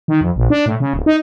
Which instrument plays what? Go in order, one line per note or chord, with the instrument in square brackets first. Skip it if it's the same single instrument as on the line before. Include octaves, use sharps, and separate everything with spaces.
[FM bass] D#3
F2
A#1
D4
A2
C#3
D1
D#4